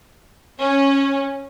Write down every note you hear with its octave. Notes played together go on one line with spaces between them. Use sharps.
C#4